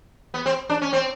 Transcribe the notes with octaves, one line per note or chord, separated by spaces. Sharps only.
B3
C4
D4
C#4
C4